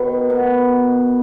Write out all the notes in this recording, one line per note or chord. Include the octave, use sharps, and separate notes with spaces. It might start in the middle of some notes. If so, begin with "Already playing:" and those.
Already playing: B2 D#3 B3
B2